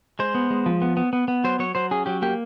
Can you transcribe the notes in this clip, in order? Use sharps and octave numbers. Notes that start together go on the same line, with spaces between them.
G#3 C5
B3
G#3
F3
B3
B3
B3
B3
F#3 C5
F#3 C#5
F#3 C5
C#4 G#4
F#3 G4
A#3 G4